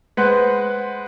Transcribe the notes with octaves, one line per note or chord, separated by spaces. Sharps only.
G#3 B4 C5 F#5